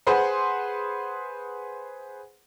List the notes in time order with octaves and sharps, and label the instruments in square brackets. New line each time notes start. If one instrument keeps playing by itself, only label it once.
[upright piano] G#4 B4 C5 F#5 C6